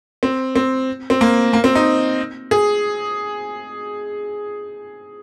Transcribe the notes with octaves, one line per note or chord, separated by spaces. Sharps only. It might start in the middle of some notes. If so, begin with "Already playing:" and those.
C4
C4
C4
A#3
A#3
C4
D#4
G#4